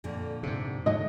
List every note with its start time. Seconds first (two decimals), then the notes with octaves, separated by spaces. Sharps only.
0.04 F2 A#2 D3
0.43 G#2 C3
0.86 G#2 D3 F#3 D#5